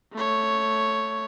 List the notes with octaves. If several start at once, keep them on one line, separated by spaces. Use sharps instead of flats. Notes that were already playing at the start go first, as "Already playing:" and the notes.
A3 C#5